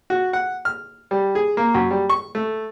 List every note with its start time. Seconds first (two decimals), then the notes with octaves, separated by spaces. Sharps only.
0.10 F#4
0.33 F#5
0.65 F6
1.11 G3
1.35 G#4
1.57 A#3
1.74 F#2
1.91 G3
2.10 C#6
2.35 A3